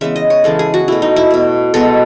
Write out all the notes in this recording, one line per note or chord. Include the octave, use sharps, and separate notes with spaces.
C#3 E3 G#3 B3 E5
D#5
C#5
C#3 E3 G#3 B3 A4
G#4
F#4
B2 A3 E4
D#4
E4
B2 A3
B2 G#3 B3 A4